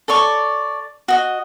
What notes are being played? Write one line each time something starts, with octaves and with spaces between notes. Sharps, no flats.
A4 C#5 D5 C#6
F#4 D#5